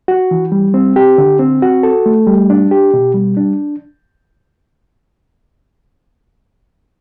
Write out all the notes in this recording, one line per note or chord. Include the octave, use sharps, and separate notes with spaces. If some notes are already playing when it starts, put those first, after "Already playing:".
F#4
E3
G3
C4
G4
D3
C4
F#4
A4
A3
G3
D4
G4
B2
G3
D4